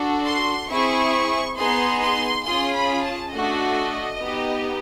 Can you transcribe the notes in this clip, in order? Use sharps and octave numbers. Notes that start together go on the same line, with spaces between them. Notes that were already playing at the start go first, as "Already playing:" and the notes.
Already playing: D4 F#4 A4
C6
C4 E4 G#4 C#6
B3 D#4 G#4 C6
C6
C#4 F4 G#4 C6
B5
A5
A3 D4 F#4 D#5
B3 D#4 G4